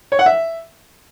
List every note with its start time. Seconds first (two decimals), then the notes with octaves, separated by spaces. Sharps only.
0.12 C#5
0.19 F#5
0.26 E5